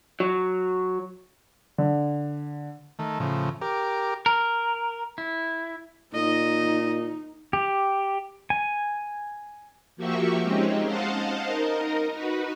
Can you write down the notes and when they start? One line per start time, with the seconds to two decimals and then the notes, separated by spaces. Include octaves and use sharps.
0.20 F#3
1.78 D3
2.99 D#3 A3
3.20 A2 C#3 F3
3.62 G4 A#4 D6
4.26 A#4
5.18 E4
6.14 A#2 D#4 D#5
7.53 G4
8.50 G#5
9.97 F3 A#3 F#4 G4 E5 C#6
10.43 G#3 C4 C#4 D#4 G4
10.85 C5 D#5 F5 F#5 A5
11.46 D#4 A#4 D#5
12.13 D#4 F#4 B4